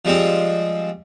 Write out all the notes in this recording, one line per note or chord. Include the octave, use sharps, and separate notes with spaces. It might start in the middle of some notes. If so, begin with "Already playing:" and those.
F3 G3 G#3 C4 F4